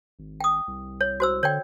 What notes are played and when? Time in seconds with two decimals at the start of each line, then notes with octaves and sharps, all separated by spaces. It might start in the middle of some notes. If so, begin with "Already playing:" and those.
0.19 G#1
0.40 G5 D#6
0.68 C2
1.01 C#5
1.20 F#4 C5 E6
1.43 D3 C#5 D5 G5